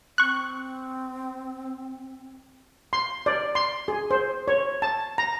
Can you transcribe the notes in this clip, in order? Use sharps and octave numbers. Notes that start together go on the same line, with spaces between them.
C4 C#6 F#6
C6
D5
C6
G#4
C5
C#5
A5
A#5